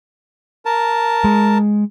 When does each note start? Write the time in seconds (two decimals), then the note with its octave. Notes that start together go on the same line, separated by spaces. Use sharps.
0.65 A#4 A5
1.24 G#3